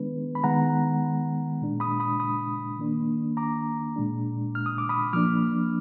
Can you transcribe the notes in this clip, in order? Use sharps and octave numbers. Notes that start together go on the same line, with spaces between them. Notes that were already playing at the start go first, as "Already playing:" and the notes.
Already playing: D#3 G#3 B3 D4 B4
B5
D#3 G#3 B3 F#5 A#5
A#2 G#3 D4
B5 D#6
B5 D#6
B5 D#6
D#3 A#3 D4
A#5 D6
A#2 G#3 D4
F6
D#6
D6
B5 D#6
F3 A#3 D4 D6 F6